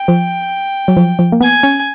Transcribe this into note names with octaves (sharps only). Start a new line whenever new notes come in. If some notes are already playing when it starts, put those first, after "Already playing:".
Already playing: G5
F3
F#3
F3
F3
A#3
B3 G#5
C#4